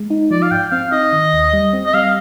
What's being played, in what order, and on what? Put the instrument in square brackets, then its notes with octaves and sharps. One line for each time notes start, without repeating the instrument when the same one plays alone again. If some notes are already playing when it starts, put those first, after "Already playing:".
Already playing: [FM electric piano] G#3
D#4
[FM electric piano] F3 [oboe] D5
[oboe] F5
[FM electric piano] G#2 [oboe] G5
[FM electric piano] C4 [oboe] F5
[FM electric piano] D#4 [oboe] D#5
[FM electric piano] D#3
D#2
G3
C4
[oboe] D#5
[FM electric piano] G3 [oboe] F5